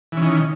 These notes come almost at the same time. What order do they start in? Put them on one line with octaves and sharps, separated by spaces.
E3 C#4 D#3